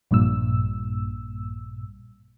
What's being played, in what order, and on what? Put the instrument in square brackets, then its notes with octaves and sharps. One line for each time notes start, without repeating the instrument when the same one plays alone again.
[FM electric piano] A#1 G2 A#2 E6